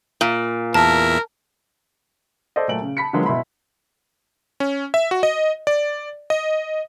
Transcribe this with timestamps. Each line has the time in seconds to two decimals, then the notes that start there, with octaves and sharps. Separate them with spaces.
0.21 A#2
0.74 E2 A#4 E5 A5
2.56 A4 C5 D5 D#5
2.68 A#2 F#3 A3 D7 F#7
2.81 C#3
2.97 A5 B5 B6 C#7
3.13 D3 F3 F#3 G#3 A#3 B3
3.25 B2 E4 E5 B5 C6
4.60 C#4
4.94 E5
5.11 F#4
5.23 D#5
5.67 D5
6.30 D#5